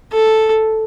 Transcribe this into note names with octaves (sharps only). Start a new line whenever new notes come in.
A4